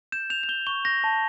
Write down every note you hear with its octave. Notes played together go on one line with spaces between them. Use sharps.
G6 E7
G6 F7
F7
G6 G7
C#6 G7
G6 A#6
A5